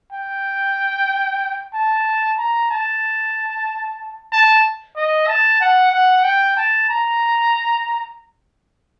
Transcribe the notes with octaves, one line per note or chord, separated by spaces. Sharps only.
G5
A5
A#5
A5
A5
D#5
A5
F#5
F#5
G5
A5
A#5